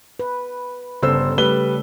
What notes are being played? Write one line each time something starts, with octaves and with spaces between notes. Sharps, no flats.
B4
G1 C#3 A4 C5 E6
G3 A3 B4 G7